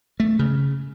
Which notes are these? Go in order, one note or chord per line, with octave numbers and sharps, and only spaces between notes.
A3
C#3